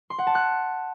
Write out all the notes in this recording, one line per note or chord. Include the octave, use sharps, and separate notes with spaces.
C6
F#5
A5
F#6